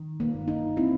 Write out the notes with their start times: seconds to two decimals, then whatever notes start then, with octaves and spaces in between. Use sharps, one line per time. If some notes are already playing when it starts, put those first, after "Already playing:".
Already playing: D#3
0.20 A#3
0.34 G2
0.48 D#4
0.76 C4 E4